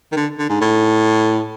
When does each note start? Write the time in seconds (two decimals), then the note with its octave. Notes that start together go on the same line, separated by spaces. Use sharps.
0.12 D#3
0.16 D3
0.39 D3
0.49 G#2
0.61 A2